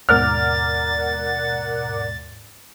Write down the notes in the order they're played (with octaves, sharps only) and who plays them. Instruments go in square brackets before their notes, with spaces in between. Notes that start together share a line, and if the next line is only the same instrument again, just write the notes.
[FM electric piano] D#2 G#2 B2 [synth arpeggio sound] A#4 D5 F#5 [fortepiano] F6 [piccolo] A6